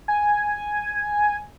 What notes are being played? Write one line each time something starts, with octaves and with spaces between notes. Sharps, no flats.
G#5